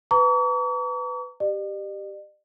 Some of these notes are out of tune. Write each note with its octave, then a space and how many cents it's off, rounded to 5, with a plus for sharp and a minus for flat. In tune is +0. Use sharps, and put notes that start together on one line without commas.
B4 +15 A#5 -20 C#6 +45
G4 +0 D5 +45